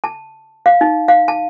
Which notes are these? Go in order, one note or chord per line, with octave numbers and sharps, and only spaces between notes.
A5
F5
D#4
F5
A5